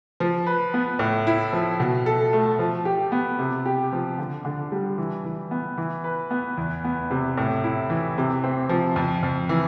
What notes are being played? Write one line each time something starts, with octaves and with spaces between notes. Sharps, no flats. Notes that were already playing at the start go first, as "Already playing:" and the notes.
F3
B4
B3
A2
E4
F3
B2
A4
A3
F3
G4
B3
C3
G4
F3
D3
D3
G3
E3
E3
B3
E3
B4
B3
E2
B3
C3
A2
E4
E3
C3
C4
F3
F2
F2
E3